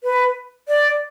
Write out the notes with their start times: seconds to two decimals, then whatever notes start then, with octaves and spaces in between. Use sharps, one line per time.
0.03 B4
0.68 D5